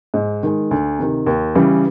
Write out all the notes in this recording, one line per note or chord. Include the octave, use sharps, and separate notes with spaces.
G#2
D#3 G#3
D2
C3 D#3
D#2
C#3 E3 G3